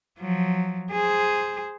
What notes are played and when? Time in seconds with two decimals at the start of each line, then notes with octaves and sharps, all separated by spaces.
0.20 F3 F#3
0.91 G#4 C5